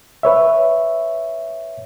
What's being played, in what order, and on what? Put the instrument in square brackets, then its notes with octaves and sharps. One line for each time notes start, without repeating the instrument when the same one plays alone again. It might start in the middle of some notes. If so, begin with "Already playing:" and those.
[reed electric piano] B4 C#5 E5